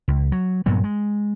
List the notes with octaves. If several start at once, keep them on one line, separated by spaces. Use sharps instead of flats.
C#2
F#3
G2 A#2 F#3 B3
G#3